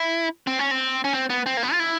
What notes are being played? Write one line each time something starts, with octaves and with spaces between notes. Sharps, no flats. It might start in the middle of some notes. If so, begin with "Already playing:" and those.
Already playing: E4
C4
C#4
C4
C#4
C4
B3
C4
A#3
B3
F4
E4